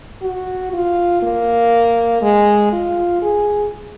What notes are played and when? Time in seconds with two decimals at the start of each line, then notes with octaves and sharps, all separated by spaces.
0.22 F#4
0.73 F4
1.22 A#3
2.22 G#3
2.72 F4
3.22 G#4